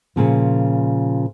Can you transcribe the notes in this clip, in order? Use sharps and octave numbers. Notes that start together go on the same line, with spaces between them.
A#2 C#3 F3